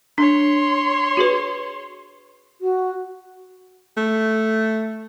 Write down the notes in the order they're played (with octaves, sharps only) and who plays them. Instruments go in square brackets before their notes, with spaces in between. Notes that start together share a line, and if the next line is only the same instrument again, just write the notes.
[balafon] D4 [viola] C#5 C6
[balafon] F#4 G#4 B4
[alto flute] F#4
[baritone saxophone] A3